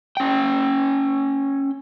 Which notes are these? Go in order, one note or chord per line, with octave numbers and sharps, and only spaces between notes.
C#4 G5